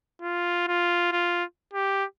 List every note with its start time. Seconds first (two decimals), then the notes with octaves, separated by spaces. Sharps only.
0.22 F4
0.68 F4
1.12 F4
1.73 G4